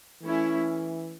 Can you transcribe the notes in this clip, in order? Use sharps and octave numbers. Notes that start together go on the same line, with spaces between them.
E3 A3 C#4 E4